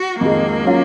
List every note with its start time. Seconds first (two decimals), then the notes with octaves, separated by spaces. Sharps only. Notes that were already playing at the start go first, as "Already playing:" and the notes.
Already playing: F#4
0.21 F2 D#3 G#3 A#3
0.64 F#3 C#4 F4